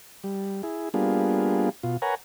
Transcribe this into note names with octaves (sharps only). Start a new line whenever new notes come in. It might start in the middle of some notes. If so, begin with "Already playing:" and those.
G3
E4 G#4
G3 A#3 B3 D4 F4 G#4
B2 F4
A#4 B4 C#5 F#5 G#5 A#5